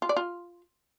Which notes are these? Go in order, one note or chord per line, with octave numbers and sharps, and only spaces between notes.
F4
D5
F4